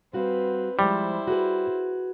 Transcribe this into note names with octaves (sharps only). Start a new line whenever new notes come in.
G3 C4 F#4 B4 F5
F3 G3 G#3 E4 C5
F#4 G#4 B4